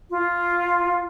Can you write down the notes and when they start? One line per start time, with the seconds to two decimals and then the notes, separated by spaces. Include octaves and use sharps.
0.08 F4